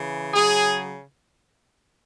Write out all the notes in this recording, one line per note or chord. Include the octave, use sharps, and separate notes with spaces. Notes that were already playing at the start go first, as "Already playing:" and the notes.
Already playing: C#3 E3
C#3 F#3 G#4